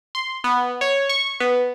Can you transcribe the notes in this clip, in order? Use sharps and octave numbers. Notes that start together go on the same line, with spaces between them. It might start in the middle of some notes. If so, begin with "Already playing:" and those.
C6
B3
C#5
C#6
B3